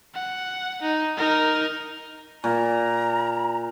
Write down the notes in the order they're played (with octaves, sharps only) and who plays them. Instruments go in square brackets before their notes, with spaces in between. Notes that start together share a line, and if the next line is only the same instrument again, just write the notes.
[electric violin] F#5
D#4
D#4 A#4
[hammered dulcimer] A#2 [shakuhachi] A#5